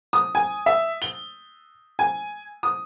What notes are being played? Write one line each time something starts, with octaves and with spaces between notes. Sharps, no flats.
D#6
G#5
E5
G7
G#5
D#6